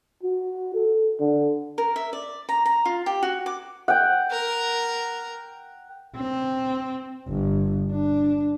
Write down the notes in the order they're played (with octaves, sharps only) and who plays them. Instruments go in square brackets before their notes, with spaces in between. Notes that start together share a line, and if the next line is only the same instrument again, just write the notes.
[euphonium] F#4
A4
D3
[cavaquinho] A#4
E5
D5
A#5
A#5
F4
G4
F#4
D6
[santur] F#5 G5
[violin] A#4
[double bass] C4
G1
D4